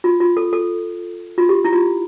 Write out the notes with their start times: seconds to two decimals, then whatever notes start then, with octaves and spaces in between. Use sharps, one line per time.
0.04 F4
0.20 F4
0.37 A4
0.53 A4
1.38 F4
1.49 G4
1.65 E4
1.73 F4